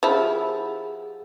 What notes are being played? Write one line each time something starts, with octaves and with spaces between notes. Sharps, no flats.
F3 E4 G4 G#4 F#5